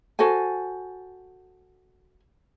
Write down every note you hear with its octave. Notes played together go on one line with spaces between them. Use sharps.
F#4 A4 C5 G#5